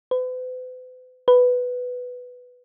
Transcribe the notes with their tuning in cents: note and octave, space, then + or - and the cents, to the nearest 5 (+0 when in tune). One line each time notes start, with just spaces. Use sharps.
B4 +45
B4 +5